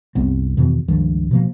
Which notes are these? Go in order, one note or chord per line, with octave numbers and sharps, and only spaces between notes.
C2 F#2 B3 C4
E2 B2 D#3
C#2 G2 D#3 F3
B2 F3 A#3